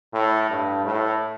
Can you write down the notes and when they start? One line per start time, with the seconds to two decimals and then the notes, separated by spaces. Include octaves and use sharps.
0.14 A2
0.50 G2
0.85 A2